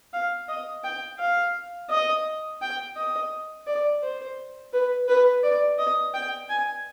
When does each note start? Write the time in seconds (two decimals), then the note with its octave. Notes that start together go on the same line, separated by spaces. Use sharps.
0.13 F5
0.49 D#5
0.84 G5
1.19 F5
1.90 D#5
2.62 G5
2.97 D#5
3.67 D5
4.03 C5
4.73 B4
5.08 B4
5.43 D5
5.79 D#5
6.14 G5
6.49 G#5